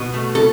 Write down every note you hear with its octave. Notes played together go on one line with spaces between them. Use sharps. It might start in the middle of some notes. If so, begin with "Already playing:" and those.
Already playing: B2
A3
A4